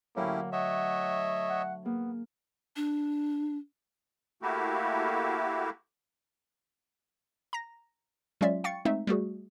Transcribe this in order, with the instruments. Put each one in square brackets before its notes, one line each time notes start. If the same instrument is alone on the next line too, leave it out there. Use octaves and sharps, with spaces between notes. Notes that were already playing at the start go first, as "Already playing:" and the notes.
[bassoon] A2 [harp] D3 F#3 [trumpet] A#3 [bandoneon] C#4 E4 G4
[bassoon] A3 [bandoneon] C#5 D#5 E5 [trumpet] F#5
[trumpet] F#5
[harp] A#3 G#4 [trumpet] B3
[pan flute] D4
[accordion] A3 A#3 E4 F#4 G4
[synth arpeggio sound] A#5 A#6
F#3 G#3 C#4 F4 D5 E5
F5 G5 C#6 A6 C#7
G#3 A3 C4 D#4 E5
G3 A3 F#4 G#4